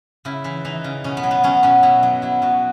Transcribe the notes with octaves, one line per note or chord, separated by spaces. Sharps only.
C#3 E4
E3 E4
E3 D#4
C#3
B2 C#4
B3
F#3
B3
F#3 C#4
B2 C#4
B2 E4
F#3
F#3 E4
B2 F#4